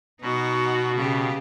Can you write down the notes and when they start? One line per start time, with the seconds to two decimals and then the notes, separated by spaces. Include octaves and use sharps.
0.21 B2 D#4 F#4
0.94 C#3 G4